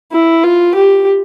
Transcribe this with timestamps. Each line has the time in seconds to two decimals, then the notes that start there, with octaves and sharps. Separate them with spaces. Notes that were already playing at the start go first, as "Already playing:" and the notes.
0.12 E4
0.43 F4
0.75 G4